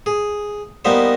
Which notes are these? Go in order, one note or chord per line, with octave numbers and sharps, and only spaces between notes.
G#4
G3 A#3 B3 D#4 C5